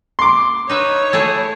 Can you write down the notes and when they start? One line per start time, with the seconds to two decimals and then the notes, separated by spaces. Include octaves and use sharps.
0.19 C6 D6
0.70 D#4 B4 C#5 E5
1.13 A3 E4 G#4